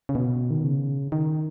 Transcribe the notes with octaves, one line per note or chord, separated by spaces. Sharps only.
C#3
B2
D#3
C#3
D#3